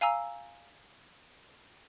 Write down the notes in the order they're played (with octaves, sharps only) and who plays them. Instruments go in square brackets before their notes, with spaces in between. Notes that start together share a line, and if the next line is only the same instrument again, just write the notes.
[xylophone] F5 G#5 A#5 E6